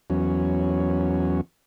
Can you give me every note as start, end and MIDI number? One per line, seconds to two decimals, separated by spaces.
0.10 1.41 40
0.10 1.41 54
0.10 1.41 61